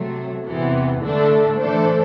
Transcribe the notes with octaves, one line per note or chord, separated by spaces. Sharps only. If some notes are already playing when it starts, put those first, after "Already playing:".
Already playing: C3 F#3 A3
E2 C3 E3 B3
D3 A3 D4 A4
E3 A3 D4 A4 C5